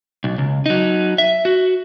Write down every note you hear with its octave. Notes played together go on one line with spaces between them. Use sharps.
B1
C#2
F#3 D#4
E5
F#4